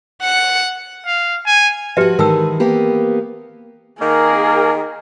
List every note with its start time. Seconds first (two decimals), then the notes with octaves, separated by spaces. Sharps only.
0.22 F#5 C#7
1.06 F5
1.46 G#5
1.97 F3 F#4 G4 B4 E5
2.19 D#3 E3 G#3 A#4 A5 E6
2.60 A#3 B3 G4
4.01 D#3 A#3 G#4 A#4